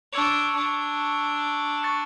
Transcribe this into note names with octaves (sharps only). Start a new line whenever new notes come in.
D4 C#6 E6 G#6 C#7 F7
D4
C#6 F#6 A6 C#7